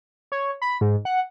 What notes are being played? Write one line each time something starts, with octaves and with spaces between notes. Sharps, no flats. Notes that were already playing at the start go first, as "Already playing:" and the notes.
C#5
B5
G#2
F#5